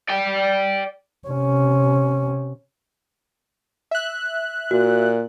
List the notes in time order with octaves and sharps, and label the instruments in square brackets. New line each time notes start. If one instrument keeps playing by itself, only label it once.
[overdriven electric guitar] D5 G5
[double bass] C3 C#4
[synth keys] E5 F#6
[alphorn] A#2 [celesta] F#4